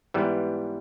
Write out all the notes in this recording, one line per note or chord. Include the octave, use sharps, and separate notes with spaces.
G#2 E3 G3 B3